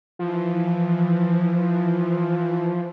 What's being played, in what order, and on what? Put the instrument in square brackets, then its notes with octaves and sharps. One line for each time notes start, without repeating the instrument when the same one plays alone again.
[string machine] E3 [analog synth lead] F3